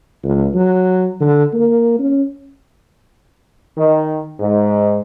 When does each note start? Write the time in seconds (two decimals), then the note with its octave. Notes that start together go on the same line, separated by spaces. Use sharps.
0.24 C#2
0.54 F#3
1.20 D3
1.54 A#3
1.99 C#4
3.76 D#3
4.39 G#2